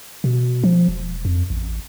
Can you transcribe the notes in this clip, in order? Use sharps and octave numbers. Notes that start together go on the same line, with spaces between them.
B2
F3
E1
F2
A1